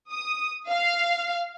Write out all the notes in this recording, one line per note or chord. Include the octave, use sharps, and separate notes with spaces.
D#6
F5